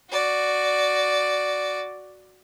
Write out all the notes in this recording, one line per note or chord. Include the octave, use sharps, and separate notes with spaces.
F#4 D5